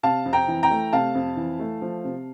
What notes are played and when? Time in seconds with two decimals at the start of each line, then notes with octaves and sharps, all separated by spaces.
0.03 C3 F5 A5
0.26 F2
0.33 G5 A#5
0.48 E3
0.63 G5 A#5
0.70 A3
0.93 C3 F5 A5
1.15 F2
1.37 E3
1.59 A3
1.82 F3
2.04 C3